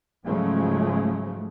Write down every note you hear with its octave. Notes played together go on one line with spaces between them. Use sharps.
G#2 C#3 F3 F#3 G#3 A3